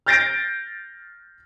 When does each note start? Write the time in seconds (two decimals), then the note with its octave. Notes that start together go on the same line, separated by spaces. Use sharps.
0.06 F6 G6 A6 A#6 C7 D7